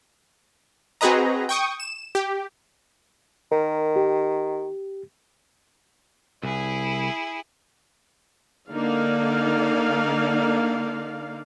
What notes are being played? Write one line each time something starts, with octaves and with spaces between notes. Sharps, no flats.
C4 F#4 G#4 B4 D#5 A#5
G5 C#6 D#6
E7
G4
D#3 A#4
G4
C2 E4 G#4
D3 A#3 D#4 D5 F5